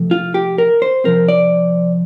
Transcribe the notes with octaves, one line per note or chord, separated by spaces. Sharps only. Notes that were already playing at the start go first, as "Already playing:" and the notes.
Already playing: C3 F3 A3
F4
G4
A#4
C5
C3 F3 C4 A#4
D5